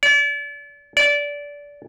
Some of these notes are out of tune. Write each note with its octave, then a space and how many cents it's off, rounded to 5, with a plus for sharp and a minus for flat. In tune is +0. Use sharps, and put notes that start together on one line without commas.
D5 -35
D5 -20